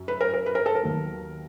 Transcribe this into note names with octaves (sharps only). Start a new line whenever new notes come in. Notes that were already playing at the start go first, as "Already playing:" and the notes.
Already playing: F#2
B4
A#4
A#4
B4
A#4
A4
A#4
D#2 D#3 F#3 B3